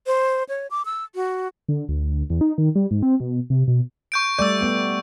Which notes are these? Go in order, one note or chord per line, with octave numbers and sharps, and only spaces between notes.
C5
C#5
D6
E6
F#4
D3
D2
E2
D#4
D#3
G3
G#2
C4
B2
C3
B2
C#6 G6 D7
G3 A3 D5 E6 G6
A3 B3